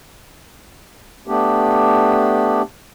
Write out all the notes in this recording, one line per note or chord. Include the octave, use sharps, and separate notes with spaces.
A3 B3 D4 G4